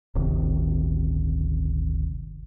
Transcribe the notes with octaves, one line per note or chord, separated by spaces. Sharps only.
D1 G1 C3 D#3